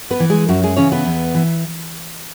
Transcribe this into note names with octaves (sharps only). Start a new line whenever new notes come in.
B3 B4
E3
G#3 G#4
F#2 F#3 F#4
G#3 G#4
C#3 E3 C#4 C#5
B3 B4
E2
E3